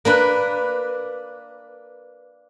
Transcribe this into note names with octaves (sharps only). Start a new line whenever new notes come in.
A#3 D4 B4